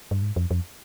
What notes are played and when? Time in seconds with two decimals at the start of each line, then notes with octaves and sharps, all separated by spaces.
0.11 G2
0.22 G#2
0.36 F2
0.51 F2